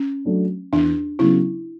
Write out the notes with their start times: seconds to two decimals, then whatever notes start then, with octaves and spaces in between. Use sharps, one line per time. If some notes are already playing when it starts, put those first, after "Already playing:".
Already playing: C#4
0.25 F#3 A3 D4
0.73 E2 D4
1.19 C#3 F#3 B3 E4